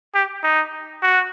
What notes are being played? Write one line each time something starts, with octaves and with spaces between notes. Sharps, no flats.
G4
D#4
F#4